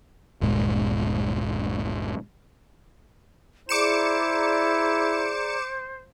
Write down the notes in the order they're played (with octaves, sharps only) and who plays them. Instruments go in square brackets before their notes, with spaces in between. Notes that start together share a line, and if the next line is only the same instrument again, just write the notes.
[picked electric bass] G1 D#2 A#2 G#3
[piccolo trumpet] E4 [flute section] G#4 D5 A#5 [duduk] C5 [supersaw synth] D6 C#7 E7